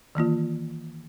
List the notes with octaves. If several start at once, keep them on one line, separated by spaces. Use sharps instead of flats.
D#3 E3 A#3 F4